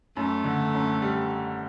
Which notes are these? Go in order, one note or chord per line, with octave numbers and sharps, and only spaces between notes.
F#2 A3
D3
F#2
G3